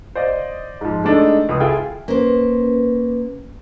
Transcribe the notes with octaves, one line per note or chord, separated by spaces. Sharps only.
C5 D5 D#5 F5
G#2 F3
G#3 A3 D4 D#4 A4
C#2 D#6
E4 F4 G#4 A4 G5
A#3 C#4 B4 C5